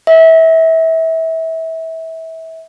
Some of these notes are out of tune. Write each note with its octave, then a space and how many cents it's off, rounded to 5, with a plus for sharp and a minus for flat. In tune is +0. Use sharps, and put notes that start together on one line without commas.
E5 -25